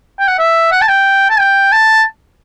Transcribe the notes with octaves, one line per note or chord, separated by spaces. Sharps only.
G5
F#5
E5
F#5
A5
G5
A5
G5
A5